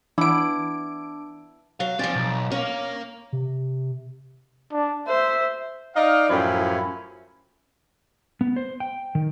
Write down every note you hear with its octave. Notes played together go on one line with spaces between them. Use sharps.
E3 B3 D4 E4 D6 D7
F#3 F5
F3 C4 D5 G#5
B1
C#4 A#4 F5
C3
D4
C5 E5
D#4 D5 D#5 F5
F#2 A2 F3 C#4 E4 B5
B3
C5
G5
D#3